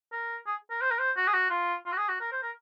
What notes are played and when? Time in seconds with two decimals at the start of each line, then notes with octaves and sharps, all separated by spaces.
0.12 A#4
0.47 G#4
0.71 A#4
0.81 C5
0.91 A#4
0.99 C5
1.16 F#4
1.27 G#4
1.33 F#4
1.50 F4
1.86 F4
1.92 F#4
1.98 G#4
2.09 F#4
2.21 A#4
2.32 C5
2.43 A#4